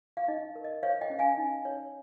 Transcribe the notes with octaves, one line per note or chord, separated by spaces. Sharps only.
F5
D#4 D#5
A#4
D#5
C5 C#5 F5
D#5 G5
C#4
F5 G#5
D#4
C#5